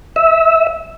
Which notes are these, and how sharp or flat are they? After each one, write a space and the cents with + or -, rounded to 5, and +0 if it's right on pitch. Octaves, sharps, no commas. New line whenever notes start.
E5 -20